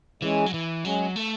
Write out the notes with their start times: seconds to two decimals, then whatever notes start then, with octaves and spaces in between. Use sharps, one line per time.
0.22 E3 G#3 C#4 G#4
0.46 F#3
0.54 E3
0.85 F#3 G#3 C#4 G#4
1.16 A3